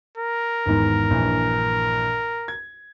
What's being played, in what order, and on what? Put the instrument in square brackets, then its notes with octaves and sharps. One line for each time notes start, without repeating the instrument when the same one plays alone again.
[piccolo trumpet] A#4
[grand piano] G#1 E2 G#2
A#1 G2 E3
G#6